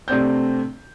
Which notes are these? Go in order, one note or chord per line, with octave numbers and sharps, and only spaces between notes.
C3 A3 C4 D4 G6